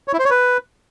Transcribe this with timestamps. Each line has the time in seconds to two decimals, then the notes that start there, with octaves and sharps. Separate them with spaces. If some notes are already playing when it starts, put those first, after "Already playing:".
0.08 C#5
0.13 E4
0.19 C5
0.25 C#5
0.30 B4